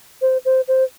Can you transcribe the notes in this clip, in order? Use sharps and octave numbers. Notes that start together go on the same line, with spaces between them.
C5
C5
C5